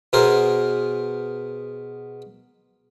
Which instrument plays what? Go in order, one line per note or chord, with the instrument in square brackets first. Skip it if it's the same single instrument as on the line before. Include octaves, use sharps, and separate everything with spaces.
[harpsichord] B2 B3 G#4 A#4 C5